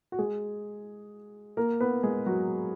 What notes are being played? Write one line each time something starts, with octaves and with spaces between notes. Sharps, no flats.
F#4
G#3 G#4
A#3 A#4
B3 B4
G#3 G#4
F#3 F#4